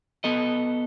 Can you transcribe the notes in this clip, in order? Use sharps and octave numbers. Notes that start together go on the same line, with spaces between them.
B3 A4 D#5